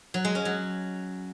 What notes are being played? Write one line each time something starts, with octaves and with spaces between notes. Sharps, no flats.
F#3
G#3
C#4
F#3